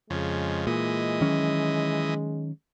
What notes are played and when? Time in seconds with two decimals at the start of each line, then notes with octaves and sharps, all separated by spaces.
0.10 F2 C#3 G#3
0.67 A#2 E3 D#5
1.21 D#3 F#3 C#4